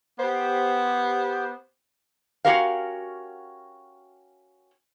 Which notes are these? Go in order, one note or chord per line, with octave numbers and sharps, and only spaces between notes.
B3 G4 C5
C#4 F#4 G4 A#4 F5